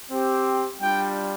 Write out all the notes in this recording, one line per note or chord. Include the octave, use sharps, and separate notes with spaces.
C4 G4
G3 D4 F4 G5